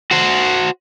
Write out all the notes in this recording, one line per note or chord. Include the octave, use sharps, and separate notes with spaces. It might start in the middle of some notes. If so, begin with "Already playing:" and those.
F#4 C5